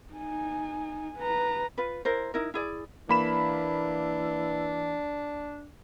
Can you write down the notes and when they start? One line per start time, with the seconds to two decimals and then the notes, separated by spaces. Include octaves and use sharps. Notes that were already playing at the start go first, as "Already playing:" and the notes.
0.13 D#4 G#5
1.18 B4 A#5
1.78 F4 B4
2.05 E4 A#4 C5
2.34 D#4 E4 A#4
2.54 E4 G#4 D5
3.09 E3 A#3 D4 B5 E7